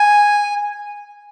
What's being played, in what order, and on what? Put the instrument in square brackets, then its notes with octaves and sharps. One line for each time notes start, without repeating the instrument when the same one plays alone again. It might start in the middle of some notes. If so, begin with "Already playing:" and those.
Already playing: [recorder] G#5